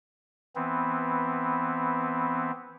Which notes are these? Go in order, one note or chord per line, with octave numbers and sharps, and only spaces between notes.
E3 B3 C4